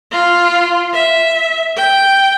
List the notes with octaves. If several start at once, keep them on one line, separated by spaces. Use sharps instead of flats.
F4
E5
G5